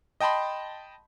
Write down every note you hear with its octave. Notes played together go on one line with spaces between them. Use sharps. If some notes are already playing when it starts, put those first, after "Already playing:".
D#5 G5 A5 B5 C6